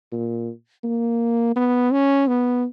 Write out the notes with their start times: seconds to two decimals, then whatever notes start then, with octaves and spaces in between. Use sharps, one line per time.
0.12 A#2
0.84 A#3
1.56 B3
1.92 C#4
2.28 B3